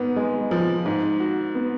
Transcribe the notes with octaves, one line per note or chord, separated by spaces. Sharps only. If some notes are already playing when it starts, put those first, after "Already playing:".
Already playing: G#2 B3
G#3
F3
G#2
F#4
B3